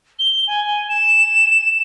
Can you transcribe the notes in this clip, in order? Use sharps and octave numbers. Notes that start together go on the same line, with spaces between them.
G7
G#5
E7